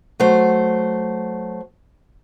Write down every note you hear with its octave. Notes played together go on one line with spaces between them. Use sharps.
F#3 A3 C5